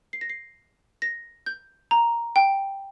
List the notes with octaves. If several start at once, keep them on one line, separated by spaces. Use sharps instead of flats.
C7
A#6
C7
A#6
G6
A#5
G5